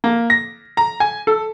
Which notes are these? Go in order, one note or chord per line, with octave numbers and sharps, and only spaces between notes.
A#3
A#6
A#5
G#5
A4